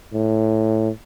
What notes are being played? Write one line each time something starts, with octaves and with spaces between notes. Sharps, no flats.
A2